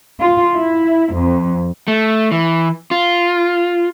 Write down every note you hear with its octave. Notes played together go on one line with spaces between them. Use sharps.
F4
E4
F2
A3
E3
F4